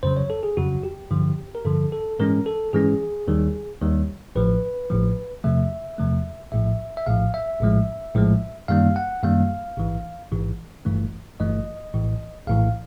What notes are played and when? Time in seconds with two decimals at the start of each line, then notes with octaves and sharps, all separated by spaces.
0.03 F2 C#3 F#3 C5
0.17 C#5
0.30 A4
0.43 G#4
0.57 F2 C#3 F#3 F#4
0.83 G4
1.11 G2 D3 F3
1.55 A#4
1.65 G2 D3 F3 A4
1.92 A4
2.19 G#2 E3 G#3 C#4 A#4
2.46 A4
2.73 G#2 E3 G#3 C#4 G#4
3.28 D#2 D#3 G3
3.82 D#2 D#3 G3
4.35 A1 A2 F3 B4
4.90 A1 A2 F3
5.44 E2 C3 F3 A3 E5
5.98 E2 C3 F3 A3
6.52 A#1 A2 F3 E5
6.97 E5
7.06 A#1 A2 F3 F5
7.34 E5
7.60 A#1 A2 F3 G#3
8.15 A#1 A2 F3 G#3
8.68 F#2 D#3 G3 A#3 F5
8.96 F#5
9.23 F#2 D#3 G3 A#3 F5
9.77 A1 G#2 E3
10.32 A1 G#2 E3
10.85 G1 G2 E3 A3
11.40 G1 G2 E3 A3 D#5
11.94 A#1 A2 E3
12.47 A#1 A2 E3 F5